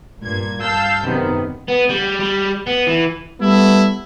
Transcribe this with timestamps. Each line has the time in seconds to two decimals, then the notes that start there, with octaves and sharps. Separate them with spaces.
0.22 G2 A#2 G#6
0.60 G2 F5 A5 E6 G6
1.04 F#2 C3 D#3 B3
1.68 B3
1.89 G3
2.20 G3
2.67 B3
2.87 E3
3.40 G3 A3 B3 E4